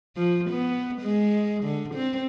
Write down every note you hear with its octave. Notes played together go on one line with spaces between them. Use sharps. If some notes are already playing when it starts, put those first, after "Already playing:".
F3
B3
G#3
D3
C4